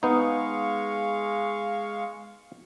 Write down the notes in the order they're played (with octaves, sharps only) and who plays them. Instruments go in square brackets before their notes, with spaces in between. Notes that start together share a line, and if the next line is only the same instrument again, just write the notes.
[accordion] G#3 F5 C#6 [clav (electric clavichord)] B3 D#4